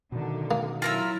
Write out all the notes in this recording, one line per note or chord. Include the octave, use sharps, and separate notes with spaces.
B2 D3 D#3
A#3
F#3 E4 F4 A#4 E6